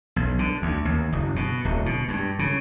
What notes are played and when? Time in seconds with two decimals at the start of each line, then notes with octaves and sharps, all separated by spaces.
0.16 B1
0.39 D3
0.62 D2
0.85 D#2
1.12 F#1
1.36 B2
1.65 D1
1.86 B2
2.08 G2
2.39 C#3